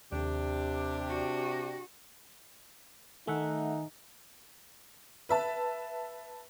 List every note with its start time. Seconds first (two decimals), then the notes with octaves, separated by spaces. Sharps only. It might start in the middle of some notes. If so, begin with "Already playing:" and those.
0.12 D#2 C3 D4 G4
1.09 F#4
3.27 D#3 A3 D#4 E5 F#5 G#5
5.29 B4 E5 A5